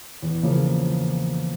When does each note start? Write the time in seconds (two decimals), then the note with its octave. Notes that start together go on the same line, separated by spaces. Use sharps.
0.22 E2
0.43 C#3 F3 A#3